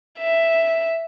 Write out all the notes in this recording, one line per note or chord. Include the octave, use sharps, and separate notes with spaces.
E5